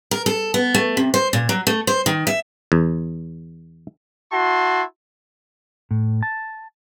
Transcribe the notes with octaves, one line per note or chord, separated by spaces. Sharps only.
A#4
A4
B3
A3
C3
C5
A#2
F#3
A3
C5
D#3
E5
E2
E4 F#4 A5 C6
A2
A5